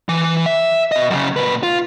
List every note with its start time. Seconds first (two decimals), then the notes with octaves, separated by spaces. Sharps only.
0.09 E3
0.46 E5
0.92 B2 D#5
1.10 F#2 C#3
1.36 A#2 B4
1.63 F4